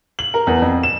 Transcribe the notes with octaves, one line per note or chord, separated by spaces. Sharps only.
F#7
A#4
E2
F2
E7